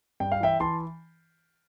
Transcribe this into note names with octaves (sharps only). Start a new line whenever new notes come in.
G2 G5
F5
E3 E5 G5
E3 A5 C6